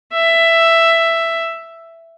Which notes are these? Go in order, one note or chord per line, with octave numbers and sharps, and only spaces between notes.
E5